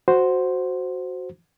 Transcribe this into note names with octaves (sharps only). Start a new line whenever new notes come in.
F#4 C5